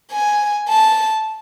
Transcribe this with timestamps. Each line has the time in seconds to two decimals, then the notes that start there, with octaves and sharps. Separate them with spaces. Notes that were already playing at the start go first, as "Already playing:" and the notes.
0.12 G#5
0.68 A5